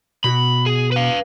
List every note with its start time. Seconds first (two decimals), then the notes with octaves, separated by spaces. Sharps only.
0.24 B2 F#4 B5
0.66 G#4
0.92 B4 F5